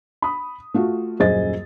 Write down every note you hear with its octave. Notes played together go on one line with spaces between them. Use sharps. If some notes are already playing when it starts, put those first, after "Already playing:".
B5 D#6
A3 F4 F#4
D#1 F#2 G#4 C5 D#5 A6